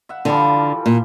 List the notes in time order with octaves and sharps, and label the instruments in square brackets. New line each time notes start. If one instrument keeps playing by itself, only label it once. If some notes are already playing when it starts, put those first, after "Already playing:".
[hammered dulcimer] E5 F#5
[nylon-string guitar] D3 [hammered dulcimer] E3 F3 G3
[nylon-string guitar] A#2